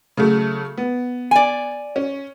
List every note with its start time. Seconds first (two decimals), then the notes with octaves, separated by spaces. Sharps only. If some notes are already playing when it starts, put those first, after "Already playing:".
0.17 C#3 F#3 A3
0.77 B3
1.31 D5 G#5
1.96 C#4